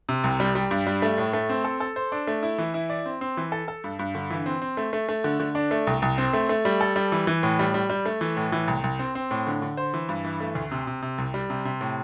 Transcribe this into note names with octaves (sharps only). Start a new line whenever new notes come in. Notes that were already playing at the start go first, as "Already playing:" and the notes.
C3
C2
G3
G3
G2
G3
A3
A2
A3
C4
A4
A4
C5
D4
A3
E4
E3
E4
D5
C4
C4
E3
A4
A4
G2
G2
D3
E3
C4
C4
A3
A3
A3
D3
D3
D4
A3
C2
C2
C4
A3
A3
G3
A4
G3
E3
E3
A2
G3
G3
G3
A3
E3
A2
E3
C2
C2
C4
C4
A2
D3
D3
C5
E3
G2
E3
A3
D2
C3
C3
C3
C2
G3
C3
C3
A2